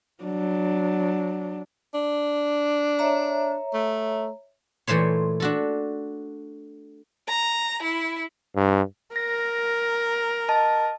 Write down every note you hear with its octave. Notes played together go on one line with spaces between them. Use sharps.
F#3 D4
D4
C#5 E5 A#5
A3
A#2 E3 A3 C5 C#5
D4 F#4 A4
A#5
E4
G2
A#4 A#6
D#5 A5